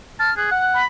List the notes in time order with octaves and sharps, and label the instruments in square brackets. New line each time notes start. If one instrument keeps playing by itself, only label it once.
[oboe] A5 [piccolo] F6
[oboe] G#4 [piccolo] F#6
[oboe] F#5
[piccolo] B5